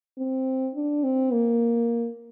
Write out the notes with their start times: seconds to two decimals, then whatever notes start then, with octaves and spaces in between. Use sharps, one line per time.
0.18 C4
0.75 D4
1.04 C4
1.33 A#3